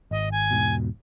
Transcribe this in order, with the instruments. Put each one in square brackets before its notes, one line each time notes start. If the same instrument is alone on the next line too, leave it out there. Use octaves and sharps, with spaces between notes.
[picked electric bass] G#1 [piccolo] D#5
[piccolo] G#5
[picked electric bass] E1 G#2 B2